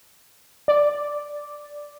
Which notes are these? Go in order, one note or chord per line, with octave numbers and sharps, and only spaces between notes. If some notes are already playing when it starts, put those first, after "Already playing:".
D5